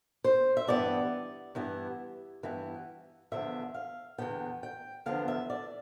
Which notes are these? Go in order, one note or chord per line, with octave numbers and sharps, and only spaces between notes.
C5
E5
G2 E3 B3 E4 D5
G2 E3 B3 E4
G2 E3 B3 E4
E2 D3 F3 B3 E5
F5
E2 D3 F3 B3 G5
G5
E2 D3 F3 B3 F5
E5
D5